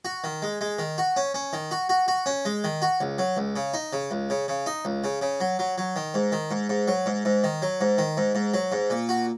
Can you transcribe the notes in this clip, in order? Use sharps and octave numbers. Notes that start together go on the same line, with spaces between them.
F#4
D#3
G#3
G#3
D#3
F#4
C#4
C#4
D#3
F#4
F#4
F#4
C#4
G#3
D#3
F#4
C#2
F#3
C#2
C#3
D#4
C#3
C#2
C#3
C#3
D#4
C#2
C#3
C#3
F#3
F#3
F#3
D#3
G#2
D#3
G#2
G#2
F#3
G#2
G#2
D#3
F#3
G#2
D#3
G#2
G#2
F#3
G#2
A#2
F#4